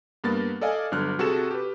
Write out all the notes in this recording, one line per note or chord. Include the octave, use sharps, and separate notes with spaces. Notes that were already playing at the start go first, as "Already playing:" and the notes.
G2 A#3 B3 A6
A4 D5 D#5 F5 G#5
G1 D3 F#3 F6 F#6
C3 F#4 G#4 A4 A5 E7
G4 B4